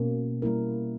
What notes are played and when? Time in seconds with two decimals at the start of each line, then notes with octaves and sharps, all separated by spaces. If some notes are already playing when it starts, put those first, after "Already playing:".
Already playing: B2 A#3 C#4
0.42 G3 A#3 E4 A#4